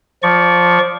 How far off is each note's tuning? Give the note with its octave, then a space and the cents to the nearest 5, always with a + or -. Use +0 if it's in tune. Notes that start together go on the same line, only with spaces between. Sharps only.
F3 +10 D5 -15 C#6 +0